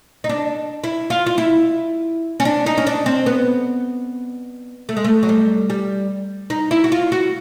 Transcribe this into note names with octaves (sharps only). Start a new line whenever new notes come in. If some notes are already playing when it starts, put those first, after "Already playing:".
D#4
D4
E4
F4
F4
E4
C#4
D4
D#4
C#4
D4
C4
B3
A3
G#3
A3
F#3
G3
G3
D#4
E4
F#4
F4
F#4